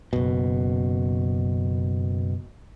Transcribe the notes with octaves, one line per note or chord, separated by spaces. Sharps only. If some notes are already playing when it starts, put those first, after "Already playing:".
F#1 B2